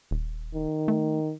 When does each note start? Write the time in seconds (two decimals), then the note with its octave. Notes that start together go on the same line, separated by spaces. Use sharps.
0.11 D#1
0.54 D#3
0.88 A3